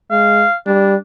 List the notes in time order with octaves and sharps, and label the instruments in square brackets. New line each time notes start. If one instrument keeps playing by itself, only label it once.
[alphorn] G#3 [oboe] F5
[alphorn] G3 [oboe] D4